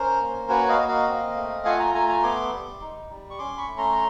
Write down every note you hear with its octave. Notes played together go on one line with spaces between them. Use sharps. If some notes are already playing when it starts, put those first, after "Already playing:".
Already playing: C#4 A#4 C5
A#3
F#4 B4 C#5
D#5 F5
A#3
D#5 F5
C4
A3
F4 F#5 G#5
G#5 A#5
A3 G#5 A#5
G#5 A#5
B3 C6 D6
G3
D#4
G3
C#6
C#4 C6 D6
B5 C#6
A3
A#5 C6